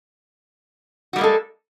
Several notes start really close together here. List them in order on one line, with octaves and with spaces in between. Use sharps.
F#4 G3 A#3 G#3 A4